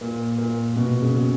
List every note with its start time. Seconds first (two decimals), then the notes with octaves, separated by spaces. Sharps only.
0.01 A#2
0.38 A#2
0.76 B2
1.01 C#3